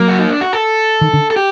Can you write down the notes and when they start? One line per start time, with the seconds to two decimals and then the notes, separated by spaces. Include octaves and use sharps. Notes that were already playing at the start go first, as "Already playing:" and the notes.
Already playing: F#3 A#3
0.08 F#4
0.18 D#4
0.29 D4
0.41 F#4
0.53 A4
1.01 D#3
1.13 D3
1.31 A4
1.36 G4